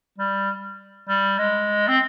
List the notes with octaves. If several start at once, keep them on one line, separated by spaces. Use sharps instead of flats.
G3
G3
G#3
C4